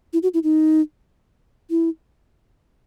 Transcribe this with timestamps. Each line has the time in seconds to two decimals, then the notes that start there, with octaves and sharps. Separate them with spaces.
0.13 E4
0.23 F#4
0.34 E4
0.44 D#4
1.70 E4